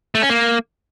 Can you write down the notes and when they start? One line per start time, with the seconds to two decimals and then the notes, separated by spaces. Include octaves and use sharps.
0.15 A3
0.22 C#4
0.30 A#3